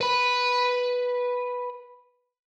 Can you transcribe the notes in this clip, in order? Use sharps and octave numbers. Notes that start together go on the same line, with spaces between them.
B4 B5